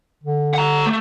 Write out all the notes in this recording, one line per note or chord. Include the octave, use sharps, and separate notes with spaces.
D3
F#5 A#5
A3